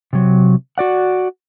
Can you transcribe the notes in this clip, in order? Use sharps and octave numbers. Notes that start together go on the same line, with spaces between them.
C3 F#3
F#4 D5 F#5